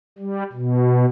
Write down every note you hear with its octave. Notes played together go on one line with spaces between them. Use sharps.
G3
B2